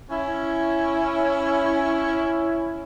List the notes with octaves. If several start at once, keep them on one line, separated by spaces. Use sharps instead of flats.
C#4 E4